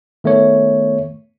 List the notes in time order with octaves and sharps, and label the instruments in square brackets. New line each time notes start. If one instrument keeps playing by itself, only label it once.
[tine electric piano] D#3 A3 B3 C#5